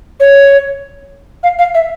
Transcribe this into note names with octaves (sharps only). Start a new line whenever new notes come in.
C#5
F5
F5
E5